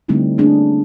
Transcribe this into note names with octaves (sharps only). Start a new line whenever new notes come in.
D3 G3 A3 C4 D#4 E4
A3 A#3 C#4 D4 G#4